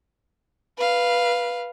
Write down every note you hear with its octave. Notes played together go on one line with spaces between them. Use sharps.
B4 F5